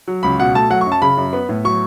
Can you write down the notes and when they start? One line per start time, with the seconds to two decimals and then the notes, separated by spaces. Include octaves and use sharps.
0.08 F#3
0.23 C#2 B5
0.39 B2 F#5
0.55 A3 A5
0.70 F#3 F#5
0.81 C#6
0.86 F#2
0.92 A5
1.02 C#3 B5
1.17 F#2
1.33 B3
1.49 A2
1.64 F#3 C#6